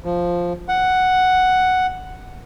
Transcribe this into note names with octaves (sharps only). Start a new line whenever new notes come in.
F3
F#5